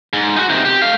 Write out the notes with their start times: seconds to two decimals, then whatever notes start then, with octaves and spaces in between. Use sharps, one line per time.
0.13 G#2
0.36 D#4 F#4
0.49 C3 D#4
0.65 G4
0.82 A3 F5